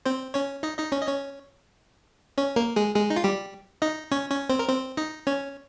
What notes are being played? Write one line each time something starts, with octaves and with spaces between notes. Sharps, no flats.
C4 C5
C#4 C#5
D#4 D#5
D#4 D#5
C#4 C#5
D#5
C#4 C#5
C#4 C#5
A#3 A#4
G#3 G#4
G#3 G#4
D#4
F4
G3 G4
D#4 D#5
C#4 C#5
C#4 C#5
C4 C5
A#4
C4 C5
D#4 D#5
C#4 C#5